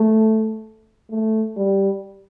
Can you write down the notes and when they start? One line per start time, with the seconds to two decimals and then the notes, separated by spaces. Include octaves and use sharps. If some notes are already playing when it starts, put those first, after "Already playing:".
Already playing: A3
1.11 A3
1.57 G3